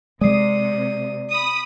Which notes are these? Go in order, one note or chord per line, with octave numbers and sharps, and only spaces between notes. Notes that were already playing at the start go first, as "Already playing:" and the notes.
C3 G#3 D5 D#6 C7
B5 D#6